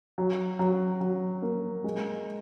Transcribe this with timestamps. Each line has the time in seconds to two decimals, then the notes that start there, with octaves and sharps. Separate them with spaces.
0.18 F#3
0.59 F#3
1.01 F#3
1.42 A#3
1.84 G#3